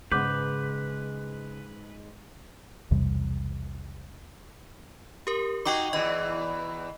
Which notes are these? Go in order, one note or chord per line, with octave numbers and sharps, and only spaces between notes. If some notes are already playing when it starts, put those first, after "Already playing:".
G#2 C#3 G#3 B3 B4 D6 G6
B1 E2 C3 G3
G4 A#4
D#4 F#4 D#5 G5 D6
E2 G#2 E3 D#5